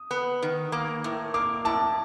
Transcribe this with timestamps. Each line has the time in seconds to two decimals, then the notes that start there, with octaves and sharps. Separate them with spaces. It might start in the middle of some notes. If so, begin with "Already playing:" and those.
Already playing: D#6
0.11 B3
0.42 D#3
0.72 A#3
1.04 A2
1.34 A#3 D6
1.65 A2 A5